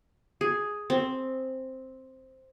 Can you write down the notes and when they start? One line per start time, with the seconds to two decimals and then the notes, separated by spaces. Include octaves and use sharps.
0.41 G#4
0.90 C4